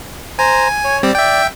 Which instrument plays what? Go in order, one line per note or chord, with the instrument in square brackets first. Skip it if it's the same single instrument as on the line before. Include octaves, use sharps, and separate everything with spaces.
[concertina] C5 A#5 [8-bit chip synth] G#5
[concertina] C#5
[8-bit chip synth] G3 C4 [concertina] D5
[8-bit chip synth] E5 G5